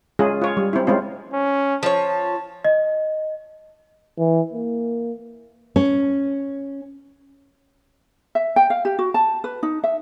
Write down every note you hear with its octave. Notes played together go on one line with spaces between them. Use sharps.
G#3 C#4 F4 G#4
F4 C#5
G3
C4 E4
G#3 C4 C#4 F4
C#4
F3 C#5 A5
D#5
E3
A#3
C#4
E5
G5
F5
G4
F#4
A5
B4
D#4
E5